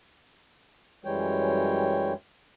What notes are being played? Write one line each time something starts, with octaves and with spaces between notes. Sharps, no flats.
F#2 E3 G3 G#3 C#5 G5